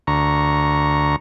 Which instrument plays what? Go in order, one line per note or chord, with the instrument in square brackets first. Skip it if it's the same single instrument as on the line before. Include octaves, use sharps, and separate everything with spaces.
[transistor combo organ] D2 A#5 C#6